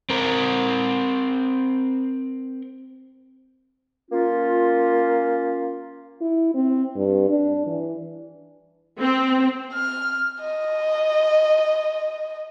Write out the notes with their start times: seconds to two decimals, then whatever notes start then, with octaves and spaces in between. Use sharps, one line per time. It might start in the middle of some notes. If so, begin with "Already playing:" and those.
0.10 C4 A#4
4.11 A#3 C#4 F4
6.21 E4
6.54 C4
6.96 G2
7.29 D4
7.67 E3
9.00 C4
9.74 F6
10.41 D#5